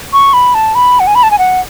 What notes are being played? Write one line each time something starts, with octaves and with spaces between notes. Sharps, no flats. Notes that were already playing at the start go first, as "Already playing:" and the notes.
C#6
B5
A5
B5
F#5
G#5
B5
A5
G#5
F#5